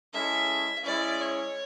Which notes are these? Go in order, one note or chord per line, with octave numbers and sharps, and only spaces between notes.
G#3 C#4 E4 A4 E5
G#3 C#4 E4 D5
C#5